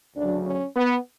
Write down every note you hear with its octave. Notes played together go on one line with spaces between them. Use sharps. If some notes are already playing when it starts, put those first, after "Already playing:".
D2 C#3 F#3 D4
C#4
B3